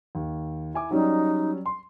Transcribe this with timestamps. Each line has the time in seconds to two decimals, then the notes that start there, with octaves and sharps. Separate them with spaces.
0.15 D#2
0.74 E4 G#5 D6
0.91 F#3 G3 C#4 D#4
1.66 C6